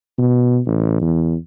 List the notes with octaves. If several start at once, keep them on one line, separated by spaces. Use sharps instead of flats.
B2
A1
E2